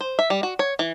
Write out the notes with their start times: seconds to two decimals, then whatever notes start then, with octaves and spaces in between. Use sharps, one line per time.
0.01 C5
0.19 E5
0.30 G3
0.43 F#4
0.59 C#5
0.79 E3